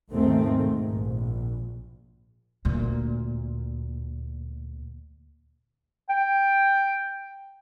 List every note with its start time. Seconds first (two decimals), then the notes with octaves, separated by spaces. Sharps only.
0.10 D#2 G#2 D#3 A3 C4
0.61 G#2
0.90 A#1
2.65 D2 A#2
6.10 G5